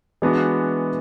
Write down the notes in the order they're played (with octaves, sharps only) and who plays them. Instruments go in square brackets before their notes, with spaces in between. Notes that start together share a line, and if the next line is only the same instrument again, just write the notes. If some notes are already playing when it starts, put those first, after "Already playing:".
[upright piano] E3 G#3 B3 D4 F#4